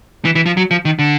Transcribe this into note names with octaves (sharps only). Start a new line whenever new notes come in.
E3
E3
F3
F#3
F3
D#3
D3